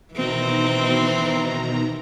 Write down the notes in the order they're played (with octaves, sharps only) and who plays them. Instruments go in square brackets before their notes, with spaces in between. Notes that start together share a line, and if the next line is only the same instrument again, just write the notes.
[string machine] B2 D#3 A#5 [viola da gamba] E3 C4